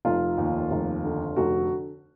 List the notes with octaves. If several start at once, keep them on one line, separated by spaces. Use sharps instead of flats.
F1 F4
D#2
F1
D3
F1 F#4